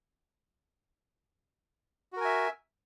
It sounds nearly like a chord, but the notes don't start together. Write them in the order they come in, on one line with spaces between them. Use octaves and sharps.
F#4 A#4 G#5 E5